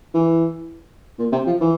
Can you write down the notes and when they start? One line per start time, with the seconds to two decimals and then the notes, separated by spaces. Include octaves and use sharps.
0.14 E3
1.19 A#2
1.32 C3
1.46 F3
1.61 E3